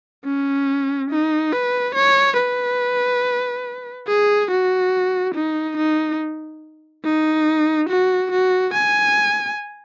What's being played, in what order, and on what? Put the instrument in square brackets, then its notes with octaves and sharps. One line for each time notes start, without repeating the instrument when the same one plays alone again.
[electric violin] C#4
D#4
B4
C#5
B4
G#4
F#4
D#4
D#4
D#4
F#4
F#4
G#5